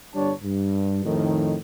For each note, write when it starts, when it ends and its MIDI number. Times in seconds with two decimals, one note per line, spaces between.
0.15 0.32 31
0.15 0.32 55
0.15 0.32 62
0.15 0.32 73
0.15 0.32 81
0.43 1.05 43
1.05 1.56 41
1.05 1.56 45
1.05 1.56 51